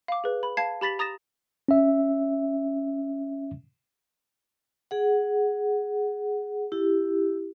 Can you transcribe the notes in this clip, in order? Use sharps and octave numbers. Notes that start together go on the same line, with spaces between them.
F5 D6
G#4 B4
B5
F5 A5 G#6 C7
G4 B5 A6 B6 F#7
A#5 D#6 A6 A#6 E7
C#4 E5
G#4 F#5
E4 G4